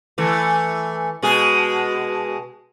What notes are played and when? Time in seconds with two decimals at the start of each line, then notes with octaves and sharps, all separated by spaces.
0.18 E3 A3
1.22 B2 G#3 G#4